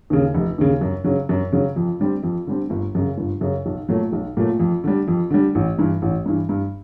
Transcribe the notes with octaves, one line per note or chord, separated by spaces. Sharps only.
D#2 C#3
F1
D#2 C#3
F#2
C#3 F#3
F#2
C#3 F#3
F2
D3 G3 C4
F2
D3 G3 C4
G1
F#2 C#3
G1
F#2 C#3
B1
A#2 F#3 A3
B1
A#2 F#3 A3
F2
D3 G3
F2
D3 G3
A1
G2 E3
A1
G2 E3
G2